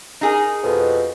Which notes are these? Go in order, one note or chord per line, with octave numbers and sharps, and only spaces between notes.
D#4 G#4 A#4
F2 B2